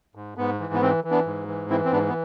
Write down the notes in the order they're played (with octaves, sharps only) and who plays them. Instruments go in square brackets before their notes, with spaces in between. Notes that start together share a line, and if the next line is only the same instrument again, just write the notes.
[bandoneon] G#2
G#2 B3
E3
B3
E3 C4
E3
B3 D4
G#2
E3
E3 C4 E4
C4
G#2 B3 D4
B3